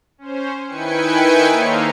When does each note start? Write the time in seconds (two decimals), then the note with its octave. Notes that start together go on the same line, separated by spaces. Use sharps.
0.18 C#4 C5
0.66 D#3 E4 B4 G5 G#5 C#7
1.50 A#3 D#4 A4 C5 C#5 F5